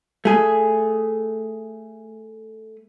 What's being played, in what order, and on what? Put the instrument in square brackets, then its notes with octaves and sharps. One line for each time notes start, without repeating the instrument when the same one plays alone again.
[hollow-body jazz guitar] A3 G#4